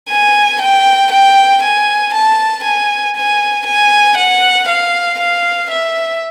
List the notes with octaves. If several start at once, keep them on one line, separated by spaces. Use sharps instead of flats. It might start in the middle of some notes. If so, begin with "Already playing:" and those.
G#5
G5
G5
G#5
A5
G#5
G#5
G#5
F#5
F5
F5
E5